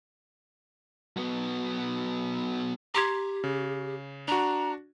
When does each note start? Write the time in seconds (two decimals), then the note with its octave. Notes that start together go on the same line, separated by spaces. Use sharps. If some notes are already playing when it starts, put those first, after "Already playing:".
1.17 F#3 B3
2.95 G4 A#5 C6 G#6
3.44 C#3
4.28 D4 F#4 A#5